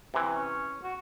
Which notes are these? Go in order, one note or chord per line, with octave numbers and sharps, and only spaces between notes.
C3 E3
C#4
F#4